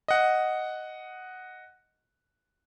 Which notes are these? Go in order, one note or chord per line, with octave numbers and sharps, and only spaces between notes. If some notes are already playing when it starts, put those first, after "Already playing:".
D#5 F#5